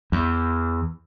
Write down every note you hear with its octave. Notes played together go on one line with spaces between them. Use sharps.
E2